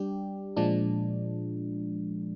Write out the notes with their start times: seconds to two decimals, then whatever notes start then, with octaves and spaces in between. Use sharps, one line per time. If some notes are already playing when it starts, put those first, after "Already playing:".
Already playing: G3 D4 G4
0.57 A#2 F3 G#3 D4